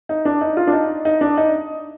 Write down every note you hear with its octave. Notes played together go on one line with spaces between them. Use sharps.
D#4
D4
D#4
F4
D4
D#4
D#4
D4
D#4